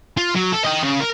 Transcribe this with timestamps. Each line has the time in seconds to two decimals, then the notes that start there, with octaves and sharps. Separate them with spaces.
0.17 F4
0.35 F#3
0.52 A4
0.65 D#5 G5
0.83 C#3
1.00 A#4